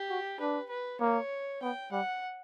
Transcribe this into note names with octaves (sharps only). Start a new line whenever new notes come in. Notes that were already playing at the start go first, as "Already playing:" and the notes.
Already playing: G4
F#4
D4 B4
B4
A#3 C#5
B3 G5
G3 F#5